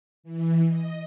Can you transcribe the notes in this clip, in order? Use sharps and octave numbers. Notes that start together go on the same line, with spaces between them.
E3
D#5